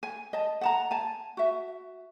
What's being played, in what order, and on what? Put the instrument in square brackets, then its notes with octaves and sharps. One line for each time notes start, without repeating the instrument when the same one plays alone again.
[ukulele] G#5
D#5 A5
F#5 A5 A#5
G#5 A5
F#4 E5